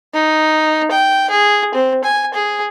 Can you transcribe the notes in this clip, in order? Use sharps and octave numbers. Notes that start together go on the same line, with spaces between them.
D#4
G5
G#4
C4
G#5
G#4